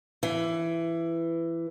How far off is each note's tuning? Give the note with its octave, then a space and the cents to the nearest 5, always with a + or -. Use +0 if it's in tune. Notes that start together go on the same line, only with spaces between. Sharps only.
E3 +15